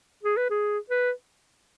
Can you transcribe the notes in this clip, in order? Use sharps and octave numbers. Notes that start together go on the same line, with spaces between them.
G#4
B4
G#4
B4